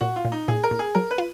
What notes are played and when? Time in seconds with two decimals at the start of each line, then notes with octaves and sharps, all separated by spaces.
0.01 A#2 F#4
0.16 F4
0.25 A#2
0.32 D#4
0.48 A#2 G#4
0.64 A#4
0.71 A#2
0.79 G#4
0.95 F#3 A#4
1.11 B4
1.18 F4